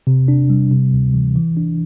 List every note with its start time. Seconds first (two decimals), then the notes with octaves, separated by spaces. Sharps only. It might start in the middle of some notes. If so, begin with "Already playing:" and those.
0.07 C3
0.28 D4
0.50 G3
0.71 C3
0.93 D2
1.14 E3
1.36 E3
1.57 D4